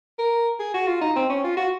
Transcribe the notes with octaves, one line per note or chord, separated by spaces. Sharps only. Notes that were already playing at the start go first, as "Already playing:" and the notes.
A#4
G#4
F#4
F4
D#4
C4
C#4
F4
F#4